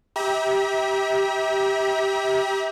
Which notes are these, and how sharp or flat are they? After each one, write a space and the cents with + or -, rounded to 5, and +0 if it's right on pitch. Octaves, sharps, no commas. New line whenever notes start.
G4 +0 E5 -35 A#5 +40